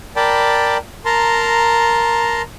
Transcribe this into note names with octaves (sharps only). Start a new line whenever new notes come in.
A#4 D5 G5 A5 B5
A#4 A5 A#5 C6